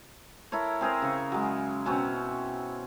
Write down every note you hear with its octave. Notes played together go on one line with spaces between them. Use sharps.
E4 A4 A#4 C#5
C4 G#4 A#4 C5
C#3 C#6
F#3 G#3
B2 C4 C#4 F#4